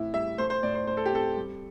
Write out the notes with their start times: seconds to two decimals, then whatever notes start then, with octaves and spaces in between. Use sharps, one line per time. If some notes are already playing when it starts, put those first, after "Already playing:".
Already playing: A2 E3 C4 E4
0.13 G3 E5
0.38 A3 C5
0.50 C5
0.63 A2 D5
0.75 C5
0.87 A2 C5
0.97 A4
1.06 G4
1.12 C4 A4
1.36 G3